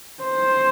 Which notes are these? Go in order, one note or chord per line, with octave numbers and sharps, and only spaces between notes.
C5